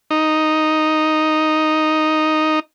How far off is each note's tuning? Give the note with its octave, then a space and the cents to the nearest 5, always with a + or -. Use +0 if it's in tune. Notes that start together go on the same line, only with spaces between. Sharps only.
D#4 +0